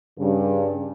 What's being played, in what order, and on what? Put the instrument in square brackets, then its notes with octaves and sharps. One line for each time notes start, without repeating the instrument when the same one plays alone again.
[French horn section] G2 C#3